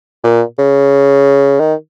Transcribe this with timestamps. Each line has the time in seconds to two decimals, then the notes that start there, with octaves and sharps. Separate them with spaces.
0.24 A#2
0.58 C#3
1.59 D#3